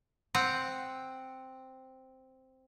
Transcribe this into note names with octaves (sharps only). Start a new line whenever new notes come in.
C4 F#5